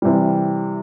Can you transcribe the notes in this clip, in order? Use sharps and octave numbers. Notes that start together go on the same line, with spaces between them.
C3 E3 G3